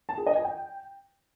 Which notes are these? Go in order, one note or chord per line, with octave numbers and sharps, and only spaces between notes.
A5
G#4
D#5
G#5
G5